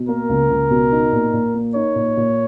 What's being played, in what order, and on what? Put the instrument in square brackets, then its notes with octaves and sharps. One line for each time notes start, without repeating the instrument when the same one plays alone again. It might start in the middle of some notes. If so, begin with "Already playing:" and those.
Already playing: [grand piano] B2
[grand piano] A#3 [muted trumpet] A#4
[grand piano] C#2
C#2
B2
D#4
A#2
A#2
A#3
[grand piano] D#4 [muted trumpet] C#5
[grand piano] A#2
A#2